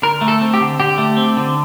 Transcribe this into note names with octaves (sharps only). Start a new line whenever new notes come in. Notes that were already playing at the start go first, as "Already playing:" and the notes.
D3 A#4
A3
A4
C4
G4
D3
D3 G4
A3
C4
D3